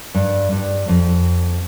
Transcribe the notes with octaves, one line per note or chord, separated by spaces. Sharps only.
G2
G2
F2